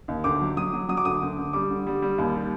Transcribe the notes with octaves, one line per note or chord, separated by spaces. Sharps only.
D#2
D2 D6
F#3
F#3 D#6
F#3
F#3 D#6
D6
D2 D#6
D2
D2
G3 D6
D3
G3
G3
D#2
G3